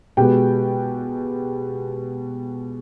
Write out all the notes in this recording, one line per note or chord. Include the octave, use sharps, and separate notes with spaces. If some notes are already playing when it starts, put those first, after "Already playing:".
B2 G#3 B3 G4 G5